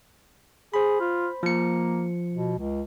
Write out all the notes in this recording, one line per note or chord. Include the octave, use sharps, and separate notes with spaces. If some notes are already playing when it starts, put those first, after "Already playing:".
G#4 C5 B5
F4
F3 A#3 C#7
B2
C#2